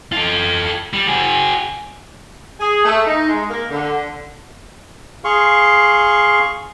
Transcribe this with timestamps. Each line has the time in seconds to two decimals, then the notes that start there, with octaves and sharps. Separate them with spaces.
0.12 F4 A4
0.93 G3
1.07 F#4 G#4
2.60 G#4
2.85 A3
3.07 D#4
3.29 G#3
3.50 A#3
3.70 D3
5.24 G#4 F5 C6 C#6